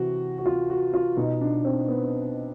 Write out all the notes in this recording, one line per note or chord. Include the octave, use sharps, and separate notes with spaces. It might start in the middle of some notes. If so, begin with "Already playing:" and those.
Already playing: C3 E3 F#4
F#4
F4
F#4
F4
B2 D#4
D4
C4
B3